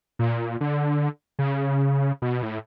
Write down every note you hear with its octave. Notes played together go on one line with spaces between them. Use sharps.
A#2
D3
C#3
B2
A2